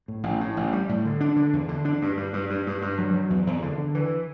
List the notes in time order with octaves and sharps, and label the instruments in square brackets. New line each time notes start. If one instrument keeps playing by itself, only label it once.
[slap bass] A2
A1
A2
A1
G3
A2
D3
D4
D3
E2
D3
D4
G2
G2
G2
G2
G2
G2
F#3
F#3
E2
E2
D3
D3
E3